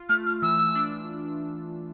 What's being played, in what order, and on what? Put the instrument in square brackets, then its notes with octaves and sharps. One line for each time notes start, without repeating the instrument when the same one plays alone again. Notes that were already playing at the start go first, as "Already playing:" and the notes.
Already playing: [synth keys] F4
[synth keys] A3 [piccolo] F6
[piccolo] F6
[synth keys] E3 [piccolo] E6
[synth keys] D4